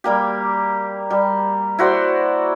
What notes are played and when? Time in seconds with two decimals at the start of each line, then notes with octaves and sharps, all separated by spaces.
0.04 G3 A#3 G4
1.11 G3
1.79 E4 F#4 C5 D5